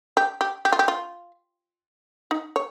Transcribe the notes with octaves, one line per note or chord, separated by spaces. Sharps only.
G4
G4
G4
F4
G4
F4
D#4
C#5